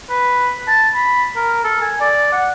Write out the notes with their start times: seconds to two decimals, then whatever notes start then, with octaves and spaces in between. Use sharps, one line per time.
0.10 B4
0.68 A5
0.95 B5
1.36 A#4
1.64 A4
1.81 G#5
2.00 D5
2.32 F#5